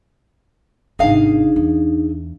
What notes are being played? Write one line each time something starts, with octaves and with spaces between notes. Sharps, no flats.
G#1 C3 D4 D#4 G#4 F5
E2